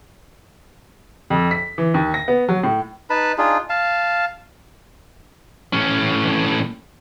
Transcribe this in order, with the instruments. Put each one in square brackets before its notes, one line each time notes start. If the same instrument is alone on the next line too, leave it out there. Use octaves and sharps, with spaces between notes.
[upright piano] F2
B6
E3
D#2
A#6
B3
F#3
A2
[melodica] D#4 B4 A5 B5
D4 D#4 F4 G#4
F5 A5
[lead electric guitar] A2 C#4